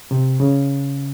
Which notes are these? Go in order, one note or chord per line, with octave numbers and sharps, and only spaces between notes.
C3
C#3